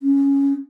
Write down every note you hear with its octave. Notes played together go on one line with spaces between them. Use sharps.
C#4